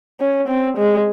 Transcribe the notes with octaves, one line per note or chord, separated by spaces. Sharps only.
C#4
C4
G#3